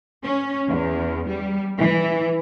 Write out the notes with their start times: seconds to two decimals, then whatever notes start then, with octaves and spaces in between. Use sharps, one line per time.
0.23 C#4
0.70 E2
1.27 G3
1.79 E3